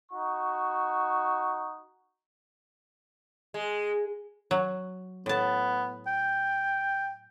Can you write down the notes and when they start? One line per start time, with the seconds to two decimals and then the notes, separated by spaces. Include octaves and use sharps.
0.11 D#4 F#4 C#6
3.54 G#3
4.51 F#3
5.26 A2 B3 A5
6.07 G5